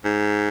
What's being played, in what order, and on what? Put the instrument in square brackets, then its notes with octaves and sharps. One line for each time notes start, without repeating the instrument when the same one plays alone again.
[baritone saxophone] G#2